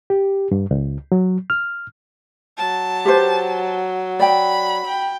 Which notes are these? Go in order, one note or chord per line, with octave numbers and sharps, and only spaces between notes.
G4
G2
C#2
F#3
F6
F#3 A5
G4 B4 C5
D5 G5 B5
G5